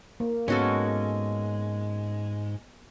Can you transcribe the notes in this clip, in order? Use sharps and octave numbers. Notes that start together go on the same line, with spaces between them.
A#3
G#2 G#3 B3 C#4 F#4 A4